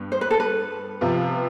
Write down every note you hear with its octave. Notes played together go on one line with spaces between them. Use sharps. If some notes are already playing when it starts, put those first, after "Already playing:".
Already playing: G2 B3
C5
B4
A4
B4
C3 F3 B3 F4